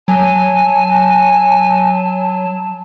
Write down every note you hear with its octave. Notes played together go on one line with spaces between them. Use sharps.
F#3 G#5 A5